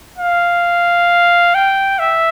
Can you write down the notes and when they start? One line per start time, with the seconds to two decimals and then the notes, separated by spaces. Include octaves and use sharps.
0.18 F5
1.55 G5
1.99 E5